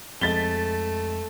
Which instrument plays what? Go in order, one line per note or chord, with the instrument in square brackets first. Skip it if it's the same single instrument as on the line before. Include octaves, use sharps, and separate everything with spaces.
[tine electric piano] F2 G#3 [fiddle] A3 [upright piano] A6 B6 G7